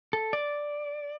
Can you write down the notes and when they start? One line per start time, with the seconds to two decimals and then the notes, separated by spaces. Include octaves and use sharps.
0.13 A4
0.33 D5